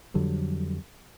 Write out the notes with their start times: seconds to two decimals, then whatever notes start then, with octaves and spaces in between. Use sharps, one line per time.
0.14 F2 D3 F#3 G3